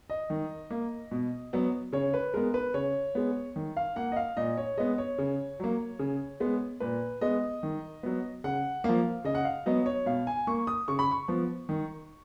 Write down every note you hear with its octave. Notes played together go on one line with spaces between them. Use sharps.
D#5
D#3
A#3
B2
F#3 B3
C#3 C#5
B4
G#3 B3 A#4
B4
C#3 C#5
G#3 B3
D#3
F5
A#3 F#5
D#5
F5
A#2 D#5
C#5
G#3 B3 D#5
C#5
C#3
F#3 A#3
C#3
G#3 B3
A#2 B4
G#3 B3 D#5
D#3
F#3 B3
C#3 F#5
F3 A#3 F5
C#3 D#5
F#5
F5
F#3 B3 D#5
C#5
B2 F5
G#5
A#3 C#6
D#6
C#3 C#6
B5
C#6
F3 B3
D#3